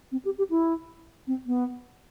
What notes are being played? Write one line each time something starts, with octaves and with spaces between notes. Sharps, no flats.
C4
G4
G4
E4
C4
B3